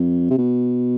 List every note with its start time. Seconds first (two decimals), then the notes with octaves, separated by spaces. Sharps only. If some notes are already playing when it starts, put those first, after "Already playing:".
Already playing: F2
0.31 C3
0.38 B2